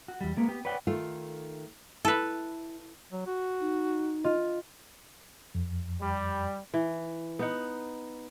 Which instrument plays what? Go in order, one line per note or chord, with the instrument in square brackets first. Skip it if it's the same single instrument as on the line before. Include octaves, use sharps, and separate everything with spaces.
[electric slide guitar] F#4
E2 G3
G#3 A#3 B3
B3 G4
B4 C#5 D5 F#5 G5
[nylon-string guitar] D#3 A3 F4
[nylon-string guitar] E4 [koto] A4 B4
[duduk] F#3
F#4
[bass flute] D#4
[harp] F4 [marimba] D#5
[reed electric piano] F2
[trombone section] G3
[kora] E3
B3 D#4 F#5